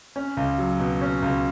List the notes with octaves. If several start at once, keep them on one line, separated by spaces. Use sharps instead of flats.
C#4
C#2
F#3
B2
C#4
C#2